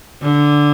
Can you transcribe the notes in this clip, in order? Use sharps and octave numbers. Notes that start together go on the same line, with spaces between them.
D3